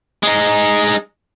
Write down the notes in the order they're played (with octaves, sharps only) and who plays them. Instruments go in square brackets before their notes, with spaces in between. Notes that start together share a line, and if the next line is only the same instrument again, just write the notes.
[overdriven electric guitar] G#3 D#4